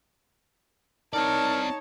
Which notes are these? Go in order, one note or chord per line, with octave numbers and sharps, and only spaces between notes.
C4 D#4 A#4 C#5 D5 A5